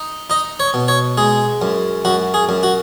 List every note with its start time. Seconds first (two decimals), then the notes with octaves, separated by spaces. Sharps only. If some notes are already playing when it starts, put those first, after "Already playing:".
Already playing: D#4
0.30 D#4 D#5
0.60 C#5
0.74 B2
0.88 C#5
1.17 G#3 G#4
1.62 F#2
2.05 F#2 F#4
2.34 G#4
2.49 F#2
2.63 F#4